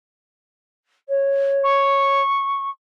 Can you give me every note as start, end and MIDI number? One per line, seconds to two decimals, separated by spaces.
1.08 2.21 73
1.64 2.70 85